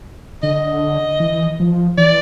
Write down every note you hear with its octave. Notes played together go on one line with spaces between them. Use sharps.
D3 D#5
E3
F3
E3 D5